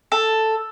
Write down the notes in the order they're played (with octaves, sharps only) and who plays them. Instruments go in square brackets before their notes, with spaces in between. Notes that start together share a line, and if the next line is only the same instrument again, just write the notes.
[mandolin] A4